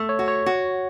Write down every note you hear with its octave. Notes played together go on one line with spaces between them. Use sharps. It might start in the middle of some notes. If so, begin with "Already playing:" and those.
Already playing: A3
C#5
F#4
C#5
F#4